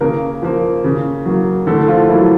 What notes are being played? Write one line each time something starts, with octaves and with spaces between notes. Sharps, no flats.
C#3 A#3 A#4
F3 A#3
C#3
F#3 A#3
D3 A3 A4
F3 F4
F#3 A#3 E4